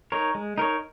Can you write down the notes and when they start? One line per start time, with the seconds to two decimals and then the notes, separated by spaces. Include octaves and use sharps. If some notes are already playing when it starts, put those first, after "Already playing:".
0.12 D#4 A#4 C#5
0.35 G#3
0.58 D#4 A#4 C#5